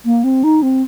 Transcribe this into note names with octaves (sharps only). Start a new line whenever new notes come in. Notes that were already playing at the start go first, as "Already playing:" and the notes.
A#3
C4
D#4
C4